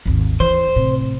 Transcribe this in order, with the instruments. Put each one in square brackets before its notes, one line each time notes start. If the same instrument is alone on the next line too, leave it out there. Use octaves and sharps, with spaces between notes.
[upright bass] G#1 D#2
[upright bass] E3 [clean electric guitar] C5
[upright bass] A2 C3